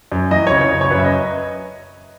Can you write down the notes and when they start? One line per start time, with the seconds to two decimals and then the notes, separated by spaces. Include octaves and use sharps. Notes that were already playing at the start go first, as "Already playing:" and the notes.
0.12 F#2
0.31 E3 D#5
0.47 C#3 C#5
0.61 C#5
0.71 F#2
0.81 C#5
0.90 F#2 B4
0.99 E5
1.05 D#5